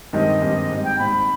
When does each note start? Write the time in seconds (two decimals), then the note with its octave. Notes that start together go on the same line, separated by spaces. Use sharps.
0.13 G2 D#3 G#3 C4 G4 D#5
0.41 G2 D#3 G#3 C4 G4
0.70 G#2 G3 C4
0.84 G5
0.99 G#2 G3 C4 B5